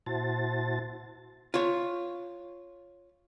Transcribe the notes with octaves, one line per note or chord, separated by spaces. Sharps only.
A#2 E4 F#4 C5 A5 A6
F4 C#5